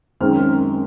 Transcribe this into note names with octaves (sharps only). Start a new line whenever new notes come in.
F#2 D#3 G#3 C4 F6